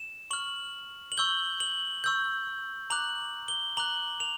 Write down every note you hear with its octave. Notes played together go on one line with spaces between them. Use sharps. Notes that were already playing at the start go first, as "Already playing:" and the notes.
Already playing: E7
C#6 F6 F#7
F#7
C#6 E6 G6 G7
F#7
C#6 E6 G6
A#5 D6 F#6 F#7
G7
A#5 D6 F#6 F#7
F7